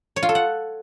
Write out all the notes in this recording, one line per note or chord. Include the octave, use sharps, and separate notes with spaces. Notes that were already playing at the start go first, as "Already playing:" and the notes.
C#5
F4
A4
F#5